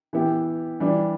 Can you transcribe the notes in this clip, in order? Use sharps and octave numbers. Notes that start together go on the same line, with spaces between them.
E3 B3 E4 G4
E3 G3 D4